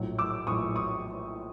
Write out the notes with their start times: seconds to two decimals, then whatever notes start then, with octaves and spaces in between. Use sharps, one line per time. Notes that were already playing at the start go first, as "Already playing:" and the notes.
Already playing: A#1 A2 F#3
0.19 D6 E6
0.47 A#1 A2 F#3 C#6 D#6
0.76 C#6 D#6